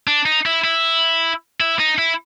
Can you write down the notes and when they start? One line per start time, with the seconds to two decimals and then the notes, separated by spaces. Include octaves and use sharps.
0.07 D4
0.26 D#4
0.46 E4
0.64 E4
1.60 E4
1.79 D#4
1.98 E4